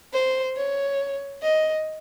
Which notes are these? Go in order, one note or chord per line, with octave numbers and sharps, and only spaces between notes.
C5
C#5
D#5